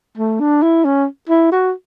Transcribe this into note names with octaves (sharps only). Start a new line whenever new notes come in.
A3
D4
E4
C#4
E4
F#4